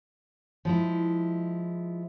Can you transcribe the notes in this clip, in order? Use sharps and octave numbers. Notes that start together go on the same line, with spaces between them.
F3 G#3 E4